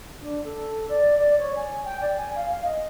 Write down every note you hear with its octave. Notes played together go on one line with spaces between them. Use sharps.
D4
A4
D5
D5
C#5
G#5
G5
D5
G#5
F5
F5
D#5